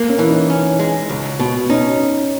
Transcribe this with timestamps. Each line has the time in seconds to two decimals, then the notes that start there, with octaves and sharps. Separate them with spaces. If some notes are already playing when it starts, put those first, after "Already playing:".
Already playing: A#3
0.09 C#4
0.19 E3
0.30 D#4
0.50 C#4
0.79 G#3
1.09 C#2
1.40 B2
1.69 C#4 D#4